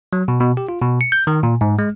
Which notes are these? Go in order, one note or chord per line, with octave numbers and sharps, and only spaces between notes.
F#3
B2
B2
G4
F4
B2
C#7
G6
D#3
A#2
G#2
G#3